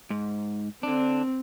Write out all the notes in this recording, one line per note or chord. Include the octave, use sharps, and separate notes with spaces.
G#2
D3 C4 D4